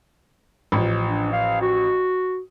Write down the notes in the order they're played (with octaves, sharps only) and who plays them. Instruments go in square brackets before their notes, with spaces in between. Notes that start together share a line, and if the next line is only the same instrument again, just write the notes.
[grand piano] A1 F3
[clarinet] D4
F5
F#4